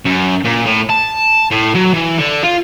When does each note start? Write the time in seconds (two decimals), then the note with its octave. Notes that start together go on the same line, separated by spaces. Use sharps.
0.06 F#2
0.45 A#2
0.65 A2
0.90 A5
1.51 A2
1.75 F#3
1.94 E3
2.19 D3
2.44 F4